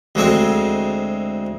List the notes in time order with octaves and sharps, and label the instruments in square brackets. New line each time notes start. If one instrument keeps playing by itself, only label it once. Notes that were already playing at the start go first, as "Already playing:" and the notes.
[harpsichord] D2 G#3 C4 G#5